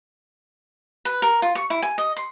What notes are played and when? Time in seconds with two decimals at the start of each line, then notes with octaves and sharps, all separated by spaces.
1.05 B4
1.22 A#4
1.42 F4
1.55 C#6
1.70 E4
1.83 G#5
1.98 D#5
2.17 C6